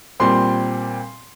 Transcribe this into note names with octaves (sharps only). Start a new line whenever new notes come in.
A#2 G3 C4 C6